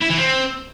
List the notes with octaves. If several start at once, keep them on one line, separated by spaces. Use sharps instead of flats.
E4
E3
C4